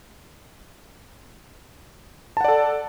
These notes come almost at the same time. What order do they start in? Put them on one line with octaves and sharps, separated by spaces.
A5 F#5 D5 A4